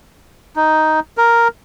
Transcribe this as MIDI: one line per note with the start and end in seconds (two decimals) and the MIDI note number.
0.56 1.00 63
1.17 1.48 70